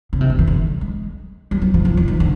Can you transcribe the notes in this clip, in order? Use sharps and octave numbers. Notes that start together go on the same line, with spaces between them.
C#3
C3
D3
D#3
D3
G#3
G3
F#3
F3
F3
E3
D#3
D3